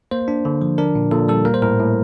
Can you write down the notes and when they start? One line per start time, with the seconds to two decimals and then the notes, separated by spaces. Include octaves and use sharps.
0.11 A#3 C5
0.28 D4
0.45 D3
0.62 F3
0.78 D4 A#4
0.95 A#2
1.11 A#2 A4
1.28 G3 A4
1.45 A#3 A#4
1.54 C5
1.62 A2 A#4
1.79 A2